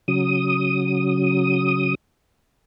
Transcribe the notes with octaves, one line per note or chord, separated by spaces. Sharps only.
C#3 F#3 D#6